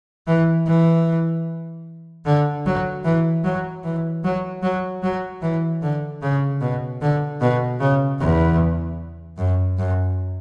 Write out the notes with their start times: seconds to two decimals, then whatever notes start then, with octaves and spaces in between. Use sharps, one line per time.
0.27 E3
0.67 E3
2.25 D3
2.66 F#3
3.05 E3
3.44 F#3
3.84 E3
4.24 F#3
4.63 F#3
5.03 F#3
5.42 E3
5.82 D3
6.22 C#3
6.61 B2
7.02 D3
7.41 B2
7.80 C#3
8.20 E2
9.38 F#2
9.78 F#2